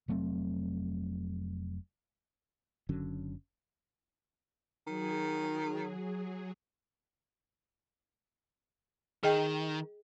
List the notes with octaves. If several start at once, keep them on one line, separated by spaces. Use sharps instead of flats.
F1 F#3 A3 C4
F#1 D3 F#3 C#4
D#3 F#3 G#4
D#3 G#4 D#5 G5